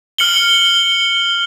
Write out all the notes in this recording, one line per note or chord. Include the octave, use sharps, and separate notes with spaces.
F6 C#7 F#7 G7